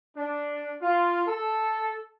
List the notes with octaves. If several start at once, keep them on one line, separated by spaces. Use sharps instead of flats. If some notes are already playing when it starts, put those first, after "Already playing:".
D4
F4
A4